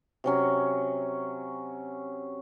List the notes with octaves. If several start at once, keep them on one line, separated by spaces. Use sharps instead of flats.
C3 F#3 C#4